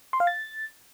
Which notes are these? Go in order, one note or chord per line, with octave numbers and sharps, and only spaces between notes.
C6
F5
A6